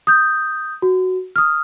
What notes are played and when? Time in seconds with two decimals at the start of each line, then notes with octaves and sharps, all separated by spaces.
0.07 D#6 G6
0.82 F#4
1.36 D#6 F6